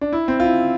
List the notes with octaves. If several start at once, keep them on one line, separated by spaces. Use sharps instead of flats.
D4
E4
C4
F4
E4